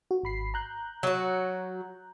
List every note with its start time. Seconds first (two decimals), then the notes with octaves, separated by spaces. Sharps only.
0.11 F#4
0.23 G#1 B5 C7
0.54 A#5 F#6 G6
1.03 F#3 F#4